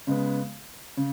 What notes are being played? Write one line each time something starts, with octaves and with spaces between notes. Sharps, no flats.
C#3 G#3 B3
C#3